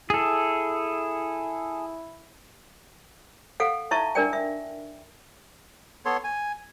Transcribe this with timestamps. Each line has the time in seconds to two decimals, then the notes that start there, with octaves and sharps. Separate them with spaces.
0.10 E4 G#4 A4
3.60 A4 F5 F#5
3.91 D#4 E4 E5 A5 C#6
4.15 D4 A#4 D5 G5
4.33 E5
6.05 B3 A4 C#5 C6
6.24 G#5